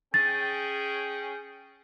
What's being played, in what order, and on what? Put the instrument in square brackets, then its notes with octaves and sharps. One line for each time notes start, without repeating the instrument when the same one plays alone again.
[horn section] C#4 G#4 G5 [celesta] A6